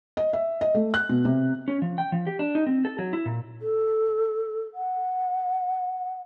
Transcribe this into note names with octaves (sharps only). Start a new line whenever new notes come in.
D#5
E5
D#5
A3
F#6
B2
C3
C#4
F3
G5
F3
G4
D4
D#4
C4
A4
F#3
E4
A#2
A4
F#5